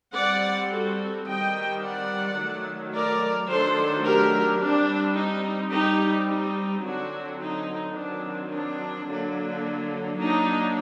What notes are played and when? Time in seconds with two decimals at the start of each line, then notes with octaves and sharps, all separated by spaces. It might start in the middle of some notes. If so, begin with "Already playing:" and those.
0.14 G3 C4 D5 F#5
0.70 F#4 A4
1.26 D#3 G3 C4 D#5 G5
1.81 D5 F#5
2.37 D#3 F#3 A3
2.93 A#4 D5
3.49 D#3 F#3 A3 D4 A4 C5
4.04 G4 A#4
4.60 G3 C4 D4
5.16 D#4
5.71 G3 C4 D#4 G4
6.27 D#4
6.83 D3 F#3 C4 D4 F#4
7.39 D#4
7.94 D#3 F#3 C4 D4
8.51 D4
9.06 D3 F#3 A#3 D4
10.18 F#3 A#3 D4 D#4